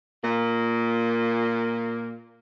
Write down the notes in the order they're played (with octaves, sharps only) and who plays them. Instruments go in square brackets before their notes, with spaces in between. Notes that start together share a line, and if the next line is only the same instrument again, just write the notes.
[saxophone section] A#2 A#3